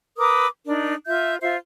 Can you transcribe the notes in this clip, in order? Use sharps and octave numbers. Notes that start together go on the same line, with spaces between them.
A#4 B4 D6 D#6
D4 D#4 A#4
F4 E5 G6
F4 C5 E5